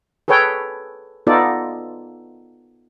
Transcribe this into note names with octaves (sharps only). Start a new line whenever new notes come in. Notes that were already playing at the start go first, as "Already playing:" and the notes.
G#4 A4 B4 C#5 G5
B3 D#4 F4 A4 D5